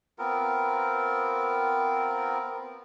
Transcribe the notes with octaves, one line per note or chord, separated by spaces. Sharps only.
B3 C4 F4 A#4